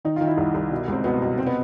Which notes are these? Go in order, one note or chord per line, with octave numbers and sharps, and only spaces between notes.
D#3 D#4
D#3 F4
E4
C2
C2
B2
C#2 C4
B2 B3
B2
C3 C4
B3